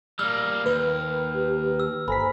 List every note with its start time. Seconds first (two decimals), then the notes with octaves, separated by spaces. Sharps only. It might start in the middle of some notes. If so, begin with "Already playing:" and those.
0.19 G3 A#3 E6 F6
0.66 D#2 B4
1.34 G4
1.80 E6
2.08 G1 A4 C5 G#5 A#5 B5 B6